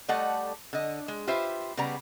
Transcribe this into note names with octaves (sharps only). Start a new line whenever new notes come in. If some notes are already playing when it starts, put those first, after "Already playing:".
G3 A3 A4 D5 D#5 F#5
D3 D#5
G#3
F4 G4 B4 C5 E5
C#3 G3 B3 D5 A#5